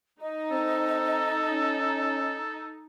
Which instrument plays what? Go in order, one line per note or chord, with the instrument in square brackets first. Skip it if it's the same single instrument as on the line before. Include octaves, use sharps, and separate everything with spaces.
[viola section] D#4 [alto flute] D#5
[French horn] C4 [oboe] A4
[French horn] C#4